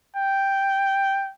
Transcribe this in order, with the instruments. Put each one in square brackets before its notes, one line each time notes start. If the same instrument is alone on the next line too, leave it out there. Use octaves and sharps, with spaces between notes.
[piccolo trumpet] G5